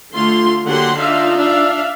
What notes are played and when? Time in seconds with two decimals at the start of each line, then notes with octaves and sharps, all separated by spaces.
0.14 D3 A3 F4 C6
0.65 D3 F#3 A#3 G4 F#5 C6
0.98 D4 D#4 F4 E5 F5
1.39 D4 E5 F5